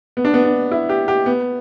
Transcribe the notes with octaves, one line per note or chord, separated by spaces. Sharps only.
B3
D4
B3
D4
E4
G4
G4
B3